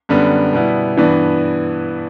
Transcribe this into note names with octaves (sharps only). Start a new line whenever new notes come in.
F#2 D3 G3 B3
B2 G3 B3 E4
G2 E3 B3 D4